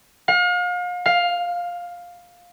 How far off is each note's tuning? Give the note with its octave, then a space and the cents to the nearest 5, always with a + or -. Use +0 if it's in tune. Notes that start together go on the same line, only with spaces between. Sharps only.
F5 +40
F5 +10